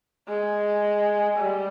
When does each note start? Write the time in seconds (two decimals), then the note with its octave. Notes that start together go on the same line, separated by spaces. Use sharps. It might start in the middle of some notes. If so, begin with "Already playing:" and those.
0.29 G#3
1.38 G3